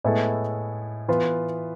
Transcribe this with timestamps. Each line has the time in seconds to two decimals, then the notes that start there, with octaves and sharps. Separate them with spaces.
0.04 A2 G#3 B3 E4 A4
1.08 E3 B3 F4 B4